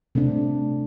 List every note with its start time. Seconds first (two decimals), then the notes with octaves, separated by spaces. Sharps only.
0.15 C3 A3 C4 D4